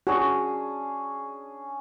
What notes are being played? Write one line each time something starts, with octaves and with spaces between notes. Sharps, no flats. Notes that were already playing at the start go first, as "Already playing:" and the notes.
C#4 D4 F#4 G#4